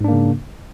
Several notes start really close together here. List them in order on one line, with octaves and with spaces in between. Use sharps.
G#2 D4 A#3 C#3